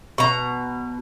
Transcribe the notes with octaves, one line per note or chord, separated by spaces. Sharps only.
B2 A#5 C#6